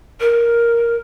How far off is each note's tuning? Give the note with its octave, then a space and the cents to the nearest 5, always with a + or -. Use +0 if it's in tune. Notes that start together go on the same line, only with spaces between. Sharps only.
A#4 +5